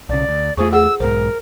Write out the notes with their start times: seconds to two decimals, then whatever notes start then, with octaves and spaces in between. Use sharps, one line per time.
0.09 B1 C#3 D5
0.29 D2
0.57 E2 A3 F4 G#4 C5 C#6
0.73 G#4 A4 F#5 E6
1.00 B1 G#2 A#4 C5